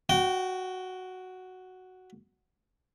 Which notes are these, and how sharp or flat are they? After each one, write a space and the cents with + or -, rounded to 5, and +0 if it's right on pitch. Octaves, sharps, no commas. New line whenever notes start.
F#4 +0 G5 -25